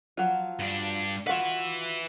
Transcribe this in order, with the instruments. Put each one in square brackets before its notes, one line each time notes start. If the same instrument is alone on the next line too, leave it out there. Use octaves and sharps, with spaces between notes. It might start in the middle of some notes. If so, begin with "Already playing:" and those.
[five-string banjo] F3 F#3 F4
[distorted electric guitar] G2 D4
[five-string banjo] F4 F#4 F#5 [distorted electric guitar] B4 E5